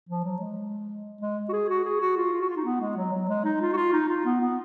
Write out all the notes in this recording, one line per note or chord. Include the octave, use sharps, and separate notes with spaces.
F3
F#3
G#3
G#3
F#4
G#4
F#4
G#4
F#4
F4
F4
F#4
F4
D#4
B3
G#3
F#3
F#3
G#3
D#4
F4
F#4
F4
D#4
F4
B3
B3